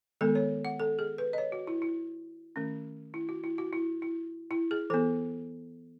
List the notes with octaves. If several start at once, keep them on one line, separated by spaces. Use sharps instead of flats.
D#3 G#3 B3 A4
C#5
F#5
A4
G#4
B4
D#5
C#5
F#4
E4
E4
D#3 A3 C#4
E4
F#4
E4
F#4
E4
E4
E4
G#4
E3 B3 A4